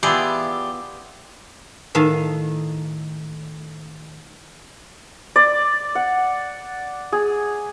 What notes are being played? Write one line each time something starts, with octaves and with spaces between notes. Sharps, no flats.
E3 B3 F4 G4 G#4 D5 E5
A2 D#3 D#4 A4 F5 A5
D5
F#5
G#4